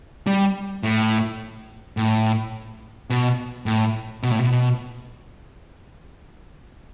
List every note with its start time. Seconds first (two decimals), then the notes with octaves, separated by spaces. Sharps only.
0.27 G3
0.83 A2
1.97 A2
3.10 B2
3.66 A2
4.23 B2
4.32 A2
4.39 B2